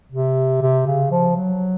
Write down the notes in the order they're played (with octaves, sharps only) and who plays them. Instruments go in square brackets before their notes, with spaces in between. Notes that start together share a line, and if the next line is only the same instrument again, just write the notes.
[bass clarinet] C3
C3
C#3
F3
F#3